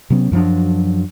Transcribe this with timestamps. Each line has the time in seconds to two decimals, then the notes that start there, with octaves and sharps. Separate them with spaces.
0.10 C3 F#3 B3 C#4
0.32 F#2 F3 F#3 D4